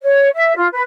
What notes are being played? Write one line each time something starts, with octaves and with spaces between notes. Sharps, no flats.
C#5
E5
F4
B4